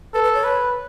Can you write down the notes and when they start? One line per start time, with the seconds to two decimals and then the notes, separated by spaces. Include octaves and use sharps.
0.14 A4 B4
0.24 B4
0.34 C#5
0.44 B4